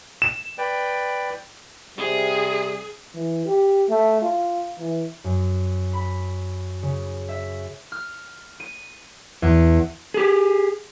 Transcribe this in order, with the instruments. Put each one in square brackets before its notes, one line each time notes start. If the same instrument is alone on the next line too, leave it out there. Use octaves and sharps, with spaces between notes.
[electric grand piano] E7
[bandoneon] B4 D5 G5
[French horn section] C3 G3 [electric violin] G#4
[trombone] E3
G4
A3
F4
E3
[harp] F#2
B5
C#3
E5
F6
D#7
E2
[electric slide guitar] G4 G#4